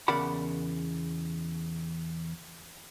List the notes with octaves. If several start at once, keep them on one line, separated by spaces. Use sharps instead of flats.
E2 C#3 A#4 D5 F#5 B5